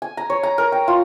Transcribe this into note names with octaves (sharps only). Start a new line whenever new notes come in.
G#5
A#5
C#5
A#5
A#4
G5
F4